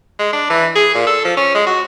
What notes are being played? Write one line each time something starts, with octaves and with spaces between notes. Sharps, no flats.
G#3
D4
E3
G#4
A#2
A4
F3
C#4
G#3
F#4